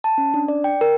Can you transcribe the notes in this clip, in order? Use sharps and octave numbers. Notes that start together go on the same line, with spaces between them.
A5
C#4
D4
D5
G5
A#4